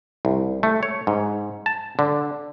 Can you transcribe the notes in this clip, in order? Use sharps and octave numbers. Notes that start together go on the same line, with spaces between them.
C2
A3
C#5
G#2
A5
D3